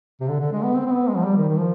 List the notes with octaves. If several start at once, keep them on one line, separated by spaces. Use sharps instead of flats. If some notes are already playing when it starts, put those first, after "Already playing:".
C3
D3
D3
G#3
B3
C4
C4
B3
G#3
F3
G3
D#3
D#3
F3